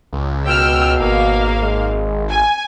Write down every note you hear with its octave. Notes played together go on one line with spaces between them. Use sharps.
C#2
B2 G5 E6 F6
G#1 A#3 F5
G#3
G#5